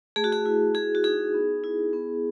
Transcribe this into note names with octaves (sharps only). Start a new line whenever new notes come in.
A3 G#4
F#4
G#4
E4
F#4 G#4
F#4
D#4 G#4
B3
E4
B3